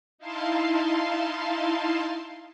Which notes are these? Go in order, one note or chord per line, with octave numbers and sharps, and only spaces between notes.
D#4 E4 F5 A5 C6